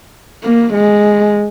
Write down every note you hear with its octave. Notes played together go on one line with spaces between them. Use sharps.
A#3
G#3